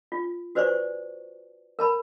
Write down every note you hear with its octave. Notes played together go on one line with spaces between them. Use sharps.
F4
F#4 B4 C5 D5 G#5 C#6
A#4 A5 B5